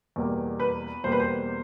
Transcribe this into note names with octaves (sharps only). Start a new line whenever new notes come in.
E2 B2 G3 A#3
B4
E2 B2 G3 A#3 C5
B4
C5